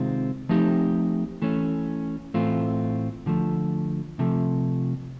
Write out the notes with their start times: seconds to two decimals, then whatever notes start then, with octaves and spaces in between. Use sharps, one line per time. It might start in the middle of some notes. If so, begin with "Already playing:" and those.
Already playing: C3 D#3 G#3 C4 F4
0.49 F3 A3 C4 D#4 G4
1.42 E3 A3 C#4
2.34 A2 E3 A3 C4 F4
3.26 D3 F3 A3
4.19 C3 F3 A3